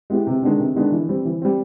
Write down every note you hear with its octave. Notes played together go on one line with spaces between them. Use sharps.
G#3 B3 E4 G4
C3
D#3 G#3 B3 D4
C3
D#3 G#3 B3 D4
E3
G3 C4
E3
G3 C4